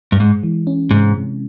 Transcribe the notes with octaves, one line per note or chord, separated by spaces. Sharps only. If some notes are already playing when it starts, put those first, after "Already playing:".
G2
G#2 G#3
E3
C#4
G#2 C3
C3